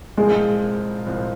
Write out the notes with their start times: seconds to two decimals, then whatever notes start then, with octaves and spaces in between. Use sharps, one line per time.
0.17 C2 A#2 F3 G#3 C4 F4
1.06 C2 A#2 F3 C4 F4